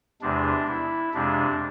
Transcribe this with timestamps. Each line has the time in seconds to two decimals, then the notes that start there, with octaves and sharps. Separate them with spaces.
0.22 E2 C3 G#3 D4
0.67 E4
1.14 F2 C3 G#3 D4